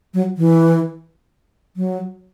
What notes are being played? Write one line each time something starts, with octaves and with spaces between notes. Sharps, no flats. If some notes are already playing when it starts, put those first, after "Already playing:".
F#3
E3
F#3